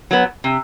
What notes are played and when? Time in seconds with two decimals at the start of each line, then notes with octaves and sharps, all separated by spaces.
0.11 F#3 B3
0.44 C3